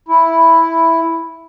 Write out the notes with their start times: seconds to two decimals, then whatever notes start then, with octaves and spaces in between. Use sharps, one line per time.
0.08 E4